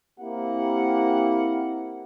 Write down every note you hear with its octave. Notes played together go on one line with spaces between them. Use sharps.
A#3 C4 E4 G4 A#4 F#5